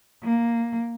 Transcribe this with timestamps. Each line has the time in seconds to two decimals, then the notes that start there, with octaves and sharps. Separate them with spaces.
0.23 A#3